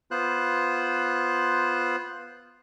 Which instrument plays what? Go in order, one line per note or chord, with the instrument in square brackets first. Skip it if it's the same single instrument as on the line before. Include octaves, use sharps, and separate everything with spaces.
[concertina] B3 F4 C5 F#6